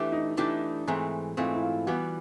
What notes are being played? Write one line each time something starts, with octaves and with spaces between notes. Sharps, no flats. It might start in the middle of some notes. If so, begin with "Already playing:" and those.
Already playing: E3 A3 D4 G4
D#4
E3 A3 D4 E4 G4
G#2 E3 A3 C4
G#2 E3 A3 C4 F4
E4
F4
E3 G3 B3 F#4